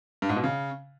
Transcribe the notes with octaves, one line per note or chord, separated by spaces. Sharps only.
G2
G#2
B2
C#3